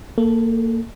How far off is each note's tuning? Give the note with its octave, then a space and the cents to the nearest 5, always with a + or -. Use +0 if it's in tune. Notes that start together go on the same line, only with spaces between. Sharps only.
A#3 -25 A4 +0